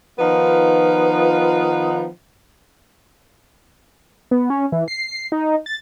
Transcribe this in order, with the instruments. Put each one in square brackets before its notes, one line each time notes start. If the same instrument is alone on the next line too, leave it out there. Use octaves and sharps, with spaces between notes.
[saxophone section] D#3 F3 B3 D#4 F4 B4
[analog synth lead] B3
C#4
E3
C7
D#4
A6